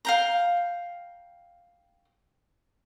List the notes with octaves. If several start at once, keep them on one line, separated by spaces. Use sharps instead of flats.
F5 G5 A#5